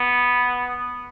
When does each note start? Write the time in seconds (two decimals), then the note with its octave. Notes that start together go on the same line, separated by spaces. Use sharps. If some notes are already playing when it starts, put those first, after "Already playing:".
Already playing: B3